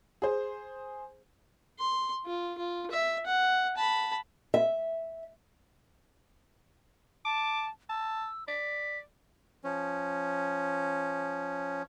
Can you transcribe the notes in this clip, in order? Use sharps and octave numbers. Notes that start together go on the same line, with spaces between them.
G#4 C5
C6
F4
F4
E5
F#5
A5 B5
E5
A5 D6
A5 E6
D5 B6
F3 C#4